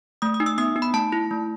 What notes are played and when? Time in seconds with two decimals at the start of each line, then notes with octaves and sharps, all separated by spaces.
0.22 A3 D#6
0.34 D#6
0.40 D#4
0.46 E6
0.58 B3 D#6
0.76 D#4
0.82 B5
0.94 A3 A5
1.12 E4
1.31 A3